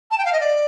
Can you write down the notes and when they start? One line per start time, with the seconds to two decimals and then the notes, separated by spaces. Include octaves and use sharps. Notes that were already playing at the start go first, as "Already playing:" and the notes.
0.10 A5
0.17 G5
0.25 F5
0.32 D#5
0.40 D5